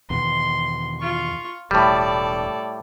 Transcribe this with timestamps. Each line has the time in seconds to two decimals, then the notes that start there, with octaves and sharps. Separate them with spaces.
0.10 E2 B2 D#3 C6
1.00 F4 C#6
1.71 E1 A2 G3 A4 D5